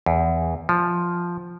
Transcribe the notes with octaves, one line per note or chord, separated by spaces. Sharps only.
E2
F3